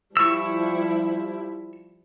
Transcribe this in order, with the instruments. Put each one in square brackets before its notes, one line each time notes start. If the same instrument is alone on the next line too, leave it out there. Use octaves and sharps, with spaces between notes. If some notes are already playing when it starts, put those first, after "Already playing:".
[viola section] F3 G3 E4 [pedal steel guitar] C#6 E6